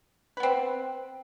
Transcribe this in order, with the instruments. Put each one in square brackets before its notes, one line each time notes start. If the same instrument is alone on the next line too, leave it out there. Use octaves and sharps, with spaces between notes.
[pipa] B4
B3
C4